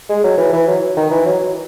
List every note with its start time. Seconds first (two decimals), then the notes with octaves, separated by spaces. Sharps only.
0.09 G#3
0.24 F#3
0.38 E3
0.53 E3
0.67 F#3
0.97 D#3
1.11 E3
1.26 F#3